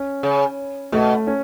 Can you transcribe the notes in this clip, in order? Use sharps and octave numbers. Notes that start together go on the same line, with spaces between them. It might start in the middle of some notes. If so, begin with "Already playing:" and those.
Already playing: C#4
C#3
B2 A3
C#4